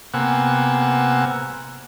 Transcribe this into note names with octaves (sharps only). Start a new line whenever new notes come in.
C3 A#3 B3 F#5 G#5 E6